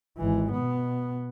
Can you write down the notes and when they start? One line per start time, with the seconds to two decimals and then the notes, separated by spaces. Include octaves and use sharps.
0.18 G#1 E3
0.52 B2 B3